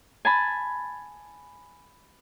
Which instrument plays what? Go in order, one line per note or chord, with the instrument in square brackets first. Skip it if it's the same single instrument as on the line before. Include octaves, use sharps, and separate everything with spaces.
[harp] G#5 A5 B5